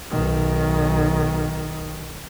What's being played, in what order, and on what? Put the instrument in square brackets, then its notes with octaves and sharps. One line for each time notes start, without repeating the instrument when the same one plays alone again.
[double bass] B1 D#3